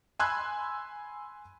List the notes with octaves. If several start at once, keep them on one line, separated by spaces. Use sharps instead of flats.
G#5 B5 C6 E6 F#6 G#6